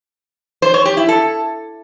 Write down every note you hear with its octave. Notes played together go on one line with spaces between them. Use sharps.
C5
C#5
G4
E4
A4